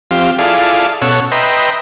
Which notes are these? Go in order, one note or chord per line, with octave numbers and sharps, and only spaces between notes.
F3 C4 G4 F5
E4 F4 G#4 A4 D5 F5
B2 C#4 A4 C#5 F#5 E6
B4 D#5 E5 G5 A#5 C6